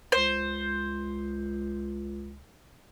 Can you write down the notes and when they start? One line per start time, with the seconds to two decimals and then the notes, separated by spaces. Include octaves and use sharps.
0.12 C#2 C5